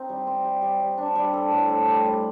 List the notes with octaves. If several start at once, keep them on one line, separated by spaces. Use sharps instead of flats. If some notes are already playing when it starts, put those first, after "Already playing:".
Already playing: C4 D#4
G3
C4
G3
G3
G3
D4
G3
A4
A2
A4
G3
G3